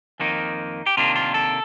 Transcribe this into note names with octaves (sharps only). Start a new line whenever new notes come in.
F2 D#3 A#3 D#4
G4
C3 D#3 A#3 D4 F4
F4
A4